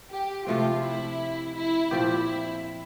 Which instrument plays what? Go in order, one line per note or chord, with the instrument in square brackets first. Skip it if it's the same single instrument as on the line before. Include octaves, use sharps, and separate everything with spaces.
[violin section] G4
[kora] C3 F3 A3 C4 [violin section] F4
[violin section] E4
E4
[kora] A#2 F3 C4 G4 [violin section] E4